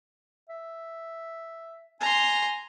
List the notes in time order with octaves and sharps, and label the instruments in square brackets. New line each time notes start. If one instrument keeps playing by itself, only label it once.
[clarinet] E5
[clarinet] G#5 [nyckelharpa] A#5 C6